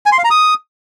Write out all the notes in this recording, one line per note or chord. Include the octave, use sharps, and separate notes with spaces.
G#5
C6
F5
A#5
D#6